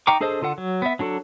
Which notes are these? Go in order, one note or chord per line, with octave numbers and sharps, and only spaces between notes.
D#4 G5 A#5 C#6 D6
D4 G#4 A4 C5 D#5
D3 F4 A4 F#5
F#3
B3 E5
F#3 D4 F#4 A4